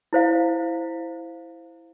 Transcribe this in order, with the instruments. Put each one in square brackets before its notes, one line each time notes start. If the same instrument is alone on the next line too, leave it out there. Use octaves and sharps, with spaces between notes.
[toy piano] E4 C5 F5